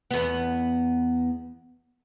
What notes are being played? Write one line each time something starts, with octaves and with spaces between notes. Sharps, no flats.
E2 B3